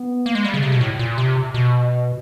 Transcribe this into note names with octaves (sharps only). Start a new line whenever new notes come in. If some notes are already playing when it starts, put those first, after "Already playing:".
Already playing: B3
A#3
G#3
G3
C#3
C3
B2
A2
A#2
C3
B2